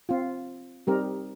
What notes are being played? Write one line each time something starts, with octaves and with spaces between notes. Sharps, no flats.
C4 F4
G3 C4 D#4 G4 A#4